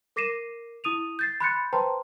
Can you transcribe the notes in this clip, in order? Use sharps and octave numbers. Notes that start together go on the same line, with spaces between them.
A#4 D6 A#6 C7 D#7 E7
E4 D#6 D#7 F7
G6 A6 C7
B5 C6 F#6 G6 A6 C#7
B4 C5 G5 A5 A#5 C6